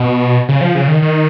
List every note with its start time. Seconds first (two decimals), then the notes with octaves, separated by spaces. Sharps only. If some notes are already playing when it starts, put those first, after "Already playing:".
Already playing: B2
0.49 C#3
0.61 F3
0.75 C#3
0.88 D#3
1.02 D#3